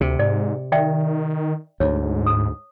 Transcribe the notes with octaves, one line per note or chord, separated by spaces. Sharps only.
D2 C3
G#2 D5
D#3 D5 E5 G5
D2 G#2 C#5
D#6